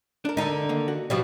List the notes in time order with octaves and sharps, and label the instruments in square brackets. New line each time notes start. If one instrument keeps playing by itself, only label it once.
[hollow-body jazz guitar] D4 A#4
[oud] D3 D#4
[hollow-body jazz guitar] D#3 A#3
F#4
[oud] B2 F3 G3